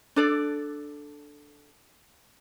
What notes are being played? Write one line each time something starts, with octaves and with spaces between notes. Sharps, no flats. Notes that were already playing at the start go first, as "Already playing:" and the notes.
D4 A4 D5